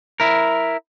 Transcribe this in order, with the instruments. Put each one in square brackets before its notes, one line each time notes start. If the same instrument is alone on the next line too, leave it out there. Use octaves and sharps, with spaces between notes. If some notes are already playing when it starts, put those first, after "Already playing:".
[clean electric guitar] E4 A#4